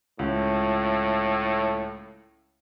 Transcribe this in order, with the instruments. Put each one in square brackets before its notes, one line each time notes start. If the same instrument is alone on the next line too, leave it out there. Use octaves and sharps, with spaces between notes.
[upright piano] C#2 [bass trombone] A2